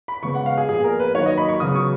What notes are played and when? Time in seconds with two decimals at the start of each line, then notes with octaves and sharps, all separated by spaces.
0.08 B5
0.23 C#3 G#3 B3 C#6
0.35 F#5
0.46 F5
0.58 G#4
0.69 A#2 F3 B3 G#4
0.84 A#4
1.00 B4
1.15 D#3 F#3 A#3 C#5
1.26 D#5
1.37 B5
1.49 C#6
1.60 C#3 F#3 B3 D#6
1.76 C#6